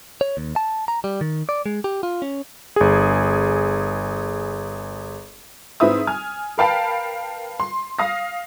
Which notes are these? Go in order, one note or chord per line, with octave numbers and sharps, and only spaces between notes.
C#5
D#2
A5
A#5
G3
D#3
D5
G#3
G4
F4
C#4
G1 G#4
G#2 C4 E4 B4 E5 D#6
G#5 F6
A#4 B4 F5 G5 A5 B5
C6
F5 D#6 A#6